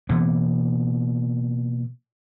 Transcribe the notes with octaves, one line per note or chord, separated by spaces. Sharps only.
B2 E3 A#3 B3